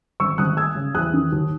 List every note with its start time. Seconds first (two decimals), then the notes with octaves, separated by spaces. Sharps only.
0.20 G#1 C#6 E6
0.38 G#1 D#6 F#6
0.57 G#3 E6 G#6
0.76 C#3
0.95 E2 D#6 F#6
1.13 D#3
1.32 D#2